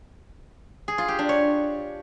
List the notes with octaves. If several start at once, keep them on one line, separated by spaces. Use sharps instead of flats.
G#4
F4
G4
D4
C#5